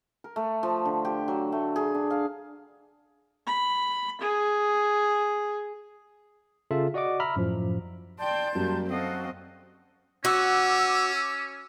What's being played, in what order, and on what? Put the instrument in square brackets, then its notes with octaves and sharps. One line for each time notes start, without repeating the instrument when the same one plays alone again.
[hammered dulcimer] A#4
A3
F3
D3
G4
F#3
A3
G#4
D4
F5
[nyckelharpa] B5
G#4
[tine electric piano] C#3 F4 A4 E5
F#4 D5 D#5 F#5 D6
E5 A#5 B5 E6 F6
F#2 A2 F3
[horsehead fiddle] D5 G5 [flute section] A5 C6 G6
[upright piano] F#2 [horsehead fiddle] G3 A#3
[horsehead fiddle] C4 D#5 [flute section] F#4 A4 F5
[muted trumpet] C#4 [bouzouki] F#4 [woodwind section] D6 E6